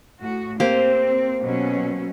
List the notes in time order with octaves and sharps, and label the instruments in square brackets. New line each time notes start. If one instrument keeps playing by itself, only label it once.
[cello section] A2 F#4
[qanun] A#3 G4 C5 [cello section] C4
[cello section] B2 F#3 C#4